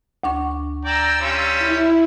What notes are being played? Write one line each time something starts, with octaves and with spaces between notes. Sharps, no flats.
D2 D4 C#6
D5 G5 A#5 E6
G3 C#4 F4
E4